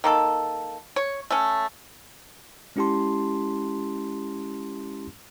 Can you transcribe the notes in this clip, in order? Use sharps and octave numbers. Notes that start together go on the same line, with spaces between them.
D#3 A#3 A4
C#5
A3 C#4
G#3 C#4 E4 G4 A5 C6